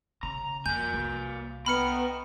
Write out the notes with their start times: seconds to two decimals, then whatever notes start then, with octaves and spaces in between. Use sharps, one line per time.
0.23 C#3 A#5
0.66 F2 A#3 G#5 G6
0.94 C2
1.66 B3 G5 A#5 B5 F6 C#7